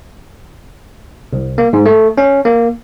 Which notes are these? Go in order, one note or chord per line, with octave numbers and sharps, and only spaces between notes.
C2
A#3
G#2
A3
C#4
A#3